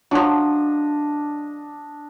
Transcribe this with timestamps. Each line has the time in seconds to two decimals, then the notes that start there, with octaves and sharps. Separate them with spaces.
0.11 F3 F#3 D4 D#5